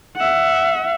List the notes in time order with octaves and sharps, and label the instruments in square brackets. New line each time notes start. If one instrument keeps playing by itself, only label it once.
[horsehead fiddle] E5 F#5